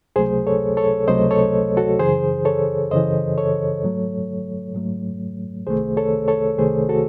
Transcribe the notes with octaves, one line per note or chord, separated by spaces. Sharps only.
C#2 C3 F#3 A3 G#4 C5
A4 C#5
A4 C#5
C#2 C3 F#3 A3 C5 D#5
A4 C#5
F#4 A4
F#2 C#3 E3 G#4 C5
A4 C#5
F#2 C#3 E3 C5 D#5
A4 C#5
G#2 F#3 A3
G#2 F#3 A3
C2 C3 D#3 A3 G#4 C5
A4 C#5
A4 C#5
C2 C3 D#3 A3 G#4 C5
F#4 A4